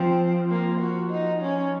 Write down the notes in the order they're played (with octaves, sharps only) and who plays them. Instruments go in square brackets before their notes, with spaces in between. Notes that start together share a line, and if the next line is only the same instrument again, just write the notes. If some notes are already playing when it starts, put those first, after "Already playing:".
Already playing: [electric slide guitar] F3 [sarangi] C4
[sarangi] A#3
F#4
D#4
C#4